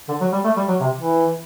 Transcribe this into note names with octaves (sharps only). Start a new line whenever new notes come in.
D3
F#3
G3
A3
G3
F#3
C3
E3